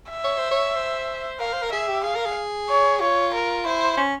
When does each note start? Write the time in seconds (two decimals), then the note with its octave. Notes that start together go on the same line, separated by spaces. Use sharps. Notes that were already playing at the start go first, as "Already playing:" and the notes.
0.10 E5
0.24 C#5
0.38 C5
0.51 C#5
0.76 C5
1.40 A#4 F5
1.53 C5
1.62 A#4
1.72 G#4 E5
1.88 G4
2.04 G#4 F5
2.15 A#4
2.26 G#4
2.69 C#5
3.01 F4 C#5
3.34 A#4
3.65 E4 C5
3.97 C#4